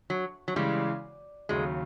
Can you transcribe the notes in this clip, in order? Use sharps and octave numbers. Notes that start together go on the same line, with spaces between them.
F#3
F#3
C#3 E3 G3 G#3
D#2 C#3 F#3 G#3